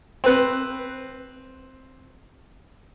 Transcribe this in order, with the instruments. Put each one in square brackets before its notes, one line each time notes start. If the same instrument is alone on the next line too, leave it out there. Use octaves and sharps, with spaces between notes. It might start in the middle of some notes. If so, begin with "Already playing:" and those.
[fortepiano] C4 B4